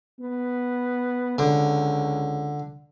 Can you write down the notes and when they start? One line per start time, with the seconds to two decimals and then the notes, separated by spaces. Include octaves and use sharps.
0.20 B3
1.38 C#2 D3